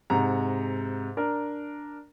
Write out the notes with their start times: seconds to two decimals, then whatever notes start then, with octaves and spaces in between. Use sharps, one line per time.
0.10 G#2 C3 A#5
1.17 D4 A#4